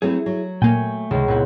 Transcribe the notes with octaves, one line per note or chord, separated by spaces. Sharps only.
F#3 A3 C4 E4 G#4
F#3
A#2 A3 A#3 G5 G#5
C#2 C3 D#3 G#3
A#2 B3 C4 E4 F#5